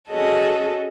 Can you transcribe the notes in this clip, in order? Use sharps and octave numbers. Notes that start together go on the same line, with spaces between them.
C#4 F#4 G#4 A4 D#5